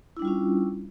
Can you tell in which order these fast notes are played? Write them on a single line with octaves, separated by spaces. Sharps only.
E4 D4 G3 F4 C#4